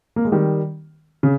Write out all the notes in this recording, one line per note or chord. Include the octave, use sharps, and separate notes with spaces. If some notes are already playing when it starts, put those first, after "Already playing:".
A#3
G#3
D#3 G3
C#3